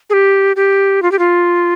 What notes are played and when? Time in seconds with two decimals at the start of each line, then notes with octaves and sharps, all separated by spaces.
0.10 G#4
0.13 G4
0.56 G4
1.02 F4
1.12 G4
1.19 F4